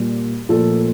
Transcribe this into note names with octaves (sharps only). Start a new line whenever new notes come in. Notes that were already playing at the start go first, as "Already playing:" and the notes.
Already playing: A#2 G3
A#2 F3 A3 A4